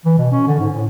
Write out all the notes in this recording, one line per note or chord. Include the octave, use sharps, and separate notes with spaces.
E3
B2
C#4
D3
G#2
A2